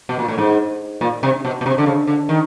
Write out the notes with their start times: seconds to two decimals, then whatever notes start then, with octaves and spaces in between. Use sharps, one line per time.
0.09 B2
0.19 A#2
0.28 A2
0.38 G#2
1.01 A#2
1.23 C3
1.45 B2
1.61 B2
1.66 C3
1.78 D3
1.86 C#3
2.07 D3
2.29 D#3